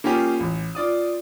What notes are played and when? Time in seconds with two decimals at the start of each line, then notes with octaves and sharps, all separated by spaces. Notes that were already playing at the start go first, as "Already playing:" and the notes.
0.04 A#3 C#4 F4 G4 G#4
0.40 A1
0.75 F4 D5 D#6